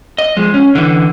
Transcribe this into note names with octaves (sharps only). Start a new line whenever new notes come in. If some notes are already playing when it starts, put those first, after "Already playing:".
D#5
F3 G#3
C#4
D3 E3